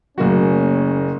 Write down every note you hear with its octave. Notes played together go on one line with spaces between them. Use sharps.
F#1 F#3 A3 A#3 C#4 F#4